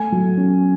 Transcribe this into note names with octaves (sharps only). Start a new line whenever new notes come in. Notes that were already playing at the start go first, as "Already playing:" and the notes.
Already playing: A3 G#5
F#3
C#4